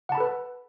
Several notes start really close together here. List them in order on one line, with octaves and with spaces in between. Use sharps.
F#5 A5 B5 A4 B4